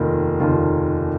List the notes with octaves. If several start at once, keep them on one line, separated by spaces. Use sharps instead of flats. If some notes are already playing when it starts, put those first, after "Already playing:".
Already playing: F1 D#2 D#3 A#3 F4
F1 D#2 D#3 A#3 F4